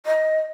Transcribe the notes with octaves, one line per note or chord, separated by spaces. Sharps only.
D#5